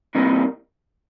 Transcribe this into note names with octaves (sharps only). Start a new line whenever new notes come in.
C3 E3 G3 A#3 D#4